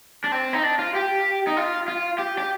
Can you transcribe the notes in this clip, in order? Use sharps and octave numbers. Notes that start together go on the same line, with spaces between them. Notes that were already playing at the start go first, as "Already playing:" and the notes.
D4
C4
D#4
D4
F4
G4
D#4
F4
F4
G4
G4